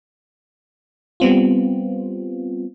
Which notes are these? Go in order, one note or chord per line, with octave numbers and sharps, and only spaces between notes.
G3 B3 C4 F4